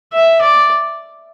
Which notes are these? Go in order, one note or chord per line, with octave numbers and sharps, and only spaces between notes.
E5
D5